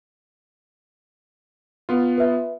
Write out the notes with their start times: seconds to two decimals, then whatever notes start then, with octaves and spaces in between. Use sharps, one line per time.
1.89 B3 F4
2.18 B4 E5